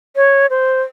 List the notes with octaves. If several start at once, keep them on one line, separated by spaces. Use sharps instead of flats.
C#5
C5